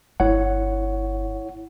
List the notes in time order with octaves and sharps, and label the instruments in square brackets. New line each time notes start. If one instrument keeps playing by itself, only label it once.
[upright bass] G1 [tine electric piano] E4 C#5 F#5